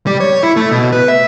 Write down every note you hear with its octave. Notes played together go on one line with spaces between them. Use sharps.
G3
C#5
E4
A3
B2
B4
E5